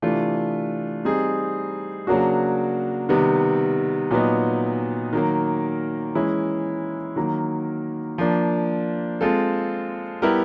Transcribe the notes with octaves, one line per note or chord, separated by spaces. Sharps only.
C3 E3 A3 D4 F4
G3 C4 D#4 G#4
C#3 F#3 A#3 D4 F#4
C3 D#3 G3 B3
A#2 F#3 B3 D#4
D#3 F#3 A#3
E3 G#3 C#4 E4
D#3 F#3 A#3
F3 A#3 D4
G#3 C4 F4 A4
G3 B3 E4 G4 A#4